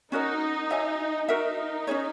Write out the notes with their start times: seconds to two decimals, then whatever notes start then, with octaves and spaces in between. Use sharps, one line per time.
0.12 C#4 D#4 F#4 A#4 D#5
0.70 F#4 C#5 E5 G#5
1.29 D#4 F#4 A#4 E5
1.87 C#4 G#4 C#5